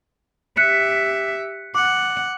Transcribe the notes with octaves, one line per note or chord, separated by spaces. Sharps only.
G4 E5 F#6 B6 C#7
F#5 D6